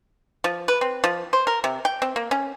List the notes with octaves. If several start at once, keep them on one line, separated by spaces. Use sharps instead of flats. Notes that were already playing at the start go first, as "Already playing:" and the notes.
F3
B4
C4
F3
C5
A#4
C3
G5
C4
A#3
C#4